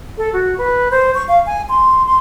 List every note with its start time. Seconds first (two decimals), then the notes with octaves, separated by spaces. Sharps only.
0.18 A4
0.33 F#4
0.58 B4
0.91 C5
1.15 C#6
1.28 F5
1.46 G#5
1.69 C6
2.06 C6